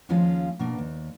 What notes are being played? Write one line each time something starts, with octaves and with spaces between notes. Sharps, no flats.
D#2 F3 G#3 C#4 F4 F5
B2 A#3 D4
D#2